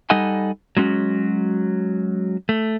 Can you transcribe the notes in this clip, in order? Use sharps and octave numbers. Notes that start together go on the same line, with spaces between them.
G3 D#4 A4 D#5 F#5 G#5
F#3 G#3 C#4 F#4
A3